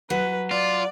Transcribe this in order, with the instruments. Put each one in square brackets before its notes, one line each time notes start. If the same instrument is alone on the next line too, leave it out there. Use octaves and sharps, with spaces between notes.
[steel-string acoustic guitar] F#3 [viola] B4
[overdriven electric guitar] F4 [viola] D5